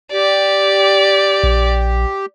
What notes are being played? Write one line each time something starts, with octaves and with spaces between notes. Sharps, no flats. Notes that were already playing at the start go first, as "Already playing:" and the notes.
G4 D5
A#1